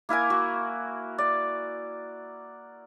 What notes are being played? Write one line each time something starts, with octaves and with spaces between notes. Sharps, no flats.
A#3 E4 A#4 G#5
F#4
D5